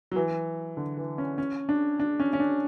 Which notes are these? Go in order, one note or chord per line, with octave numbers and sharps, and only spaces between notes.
F#3
E3
D3
E3
C#4
C#4
D4
D4
C#4
C#4
D4